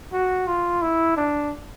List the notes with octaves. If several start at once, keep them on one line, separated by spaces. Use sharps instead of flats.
F#4
F4
E4
D4